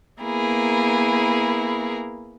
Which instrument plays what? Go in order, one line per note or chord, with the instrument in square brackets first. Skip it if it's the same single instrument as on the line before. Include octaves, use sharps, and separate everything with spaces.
[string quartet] A#3 B3 E4 G#4 A#4